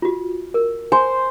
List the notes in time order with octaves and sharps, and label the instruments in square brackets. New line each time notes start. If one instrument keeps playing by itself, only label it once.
[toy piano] F4 F#4
A#4
[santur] C5 [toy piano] G#5